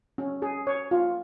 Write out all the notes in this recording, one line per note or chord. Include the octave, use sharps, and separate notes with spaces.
C#4
G#4
C#5
F4